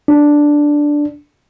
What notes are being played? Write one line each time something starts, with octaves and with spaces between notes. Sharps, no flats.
D4